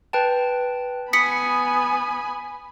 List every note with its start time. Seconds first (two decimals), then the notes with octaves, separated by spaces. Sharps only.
0.13 B4 G5 A5
1.13 B3 G#5 B5 D#6 B6 C#7